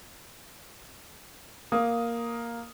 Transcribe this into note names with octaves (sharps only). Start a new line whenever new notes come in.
A#3 D#6